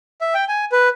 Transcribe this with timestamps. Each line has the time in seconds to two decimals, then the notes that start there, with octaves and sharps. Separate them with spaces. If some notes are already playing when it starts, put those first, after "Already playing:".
0.21 E5
0.34 G5
0.49 G#5
0.72 B4